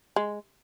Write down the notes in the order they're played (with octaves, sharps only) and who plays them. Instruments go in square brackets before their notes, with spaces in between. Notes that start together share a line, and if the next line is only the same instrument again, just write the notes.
[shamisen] G#3